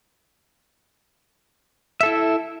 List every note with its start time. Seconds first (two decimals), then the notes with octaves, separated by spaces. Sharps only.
2.01 E5
2.03 A4
2.06 E4